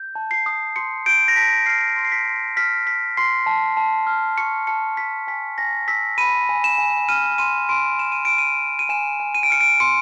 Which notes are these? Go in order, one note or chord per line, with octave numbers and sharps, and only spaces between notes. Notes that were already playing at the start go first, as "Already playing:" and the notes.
Already playing: G6
A5
C7
D#6
C6 C#7
G6 D7
A#6
A5 B6
F6 C7
C6
C7
B6
C6
F6 B6
F6 B6
C6 C7
A5
A5
F6
C#6 C#7
A5 C#7
A5 B6
G#5 B6
G#5 A#6
E6 B6
B5 D#7
G#5
E7
G#5
F6 D#7
C6 D#7
C6 D7
F6 E7
D#7
F6 D7
D#7
C6
D#7
G#5 E7
G#5
D#7
D7
F6 C#7
D7
C6 C#7